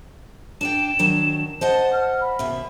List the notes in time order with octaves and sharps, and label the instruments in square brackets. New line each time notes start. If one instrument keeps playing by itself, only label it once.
[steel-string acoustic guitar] D4 D5 G5 [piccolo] E7
[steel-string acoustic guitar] D#3 F#3 D4
[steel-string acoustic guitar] C5 D#5 F#5 [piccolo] A5
[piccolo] F6
B5
[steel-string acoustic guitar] D#2 B2 E5